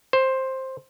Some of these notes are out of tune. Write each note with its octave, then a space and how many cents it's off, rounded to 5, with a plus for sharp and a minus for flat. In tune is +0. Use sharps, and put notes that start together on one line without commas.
C5 +10